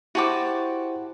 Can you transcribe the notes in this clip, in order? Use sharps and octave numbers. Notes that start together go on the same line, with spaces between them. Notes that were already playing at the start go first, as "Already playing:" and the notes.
E4 F#4 G4 C5 A5 D6